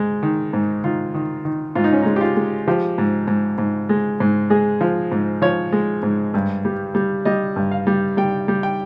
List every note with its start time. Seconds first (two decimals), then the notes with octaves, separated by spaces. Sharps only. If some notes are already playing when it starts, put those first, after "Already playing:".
Already playing: G#2 G#3
0.23 D#3
0.53 G#2
0.84 D#3 F4
1.14 D#3
1.45 D#3
1.75 G#2 F4
1.84 D#4
1.93 C#4
2.02 G#3 D#4
2.16 G4
2.21 F4
2.36 G#3
2.68 F3 G4
2.98 G#2
3.28 G#2
3.58 G#2
3.89 G#3
4.20 G#2
4.50 G#3 G#4
4.81 F3
5.12 G#2
5.42 F3 C#5
5.73 G#3
6.03 G#2
6.34 G2
6.65 G3
6.95 G3
7.25 G3 D#5
7.56 G2
7.71 F5
7.87 G3
8.17 G3 G5
8.48 G3
8.63 G5